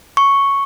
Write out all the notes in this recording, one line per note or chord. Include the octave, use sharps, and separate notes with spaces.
C#6